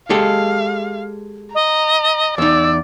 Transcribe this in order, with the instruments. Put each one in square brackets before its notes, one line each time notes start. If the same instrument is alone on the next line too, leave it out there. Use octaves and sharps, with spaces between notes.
[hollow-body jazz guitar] G#3 G4 A4 [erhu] F5
[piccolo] D#5 [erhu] A#5
[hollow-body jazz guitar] E2 D#4 [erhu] D5 [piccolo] E6